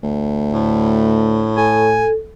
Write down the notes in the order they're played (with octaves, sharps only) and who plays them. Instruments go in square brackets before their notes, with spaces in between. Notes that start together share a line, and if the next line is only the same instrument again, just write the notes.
[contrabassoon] D2
[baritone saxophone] A2
[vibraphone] A4 [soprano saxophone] G#5